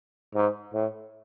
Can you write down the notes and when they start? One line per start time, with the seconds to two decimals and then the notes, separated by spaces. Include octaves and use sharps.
0.34 G#2
0.74 A2